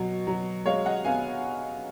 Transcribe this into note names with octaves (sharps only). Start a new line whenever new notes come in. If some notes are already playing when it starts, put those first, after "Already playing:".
Already playing: B2 F#3
F#3
G#3 C#5 F5
D#5 F#5
B3 F5 G#5